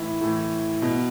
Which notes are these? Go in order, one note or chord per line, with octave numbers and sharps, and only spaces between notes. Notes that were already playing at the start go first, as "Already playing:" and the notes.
Already playing: A2 E3 E4
A2 E3
B2